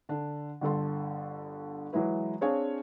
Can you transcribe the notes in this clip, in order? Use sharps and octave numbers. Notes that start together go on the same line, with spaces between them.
D3 D4
G1 D3 A4 C6
E3 F#3 G#3 E4 B4
C4 D4 G#4 C#5 F5 G#5